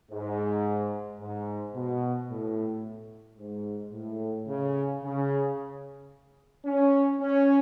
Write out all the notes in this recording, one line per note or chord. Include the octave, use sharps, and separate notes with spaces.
G#2
G#2
B2
A2
G#2
A2
C#3
C#3
C#4
C#4